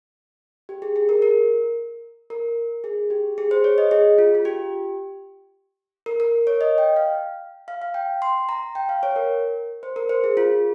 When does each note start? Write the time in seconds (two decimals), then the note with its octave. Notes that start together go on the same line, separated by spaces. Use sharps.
0.69 G4
0.82 G#4
0.96 G#4
1.09 A#4
1.22 A#4
2.30 A#4
2.84 G#4
3.10 G4
3.38 G#4
3.51 C5
3.64 C#5
3.78 D#5
3.91 G#4
4.18 F4
4.35 F4
4.45 G4
6.06 A#4
6.20 A#4
6.47 C#5
6.61 D#5
6.78 G5
6.96 F5
7.68 F5
7.82 F5
7.94 G5
8.22 C6
8.49 A#5
8.75 G5
8.89 F5
9.03 C#5
9.16 A#4
9.83 C5
9.96 A#4
10.09 C5
10.24 G#4
10.37 F4